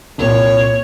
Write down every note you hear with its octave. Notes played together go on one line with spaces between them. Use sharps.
C2 A#2 C#5